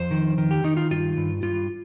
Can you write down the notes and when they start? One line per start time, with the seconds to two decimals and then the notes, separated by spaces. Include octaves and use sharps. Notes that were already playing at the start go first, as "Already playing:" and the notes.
Already playing: F2 C5
0.11 D#3
0.38 D#3
0.51 G4
0.64 D#3 D#4
0.77 F4
0.91 G2 F4
1.17 G2
1.43 G2 F4